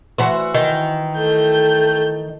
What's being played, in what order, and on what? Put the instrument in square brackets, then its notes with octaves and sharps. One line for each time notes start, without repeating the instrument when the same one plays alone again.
[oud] E3 F#4 C5
[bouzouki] D#3
[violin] A3 G6